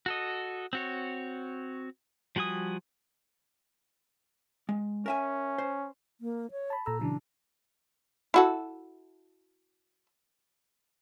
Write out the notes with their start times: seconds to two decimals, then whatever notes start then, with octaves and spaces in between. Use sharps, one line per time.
0.06 F#4 A4 D#5
0.73 C4 F#4 C#5
2.36 F3 G3 F#4 G#5 D#6
4.69 G#3
5.06 C#4 A#4 E5 G#5
5.58 C5
6.21 A#3
6.51 C#5
6.70 A5 B5
6.86 A#2 A4 A#5 E6
7.01 C#3 E3 F#3 D4
8.34 E4 F#4 A4